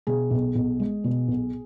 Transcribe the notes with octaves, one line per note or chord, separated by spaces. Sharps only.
B2 G#4
B1
B1
G#3
B2
B1